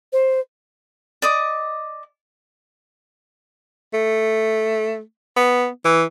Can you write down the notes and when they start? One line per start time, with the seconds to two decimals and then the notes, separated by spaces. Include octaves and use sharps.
0.12 C5
1.22 D5 D#5 D6
3.94 A3
5.36 B3
5.85 E3